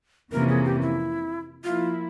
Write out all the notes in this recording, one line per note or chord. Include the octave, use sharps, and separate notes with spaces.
F2 C3 E3 A#3 C#4 A#4
G#4
G4
E4
F3 A#3 E4 F4